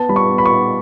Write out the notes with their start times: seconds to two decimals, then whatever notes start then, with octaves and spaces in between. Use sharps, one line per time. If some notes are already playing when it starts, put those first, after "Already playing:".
Already playing: B3 A5
0.09 G3 B5
0.16 C#6
0.31 B3
0.38 B5
0.45 C#6
0.53 B3